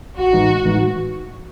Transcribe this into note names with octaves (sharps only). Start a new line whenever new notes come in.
A1 F#4
A2 E3 G#3 D#4
A1
A2 E3 G#3 D#4